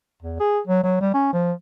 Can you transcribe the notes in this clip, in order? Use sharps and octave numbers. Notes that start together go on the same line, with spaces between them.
E2
G#4
F#3
F#3
G3
C#4
F3